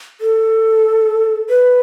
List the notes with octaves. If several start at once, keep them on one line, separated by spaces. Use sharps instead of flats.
A4
B4